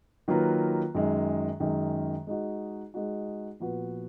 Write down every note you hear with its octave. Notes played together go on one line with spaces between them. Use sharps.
D#3 F#3 A#3 F4 B4
F#2 D#3 G#3
F#2 D#3 G#3
G#3 D#4 F#4
G#3 D#4 F#4
A#2 F3 B3 F#4 B4